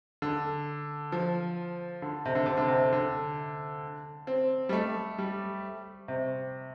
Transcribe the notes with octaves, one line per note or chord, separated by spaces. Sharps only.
D3
F3
D3
C3
D3
C3
D3
C3
D3
C4
G3
A3
G3
C3